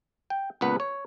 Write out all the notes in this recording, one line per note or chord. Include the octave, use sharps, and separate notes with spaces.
G5
C#2 A#2 B3 B4 F#5
C#5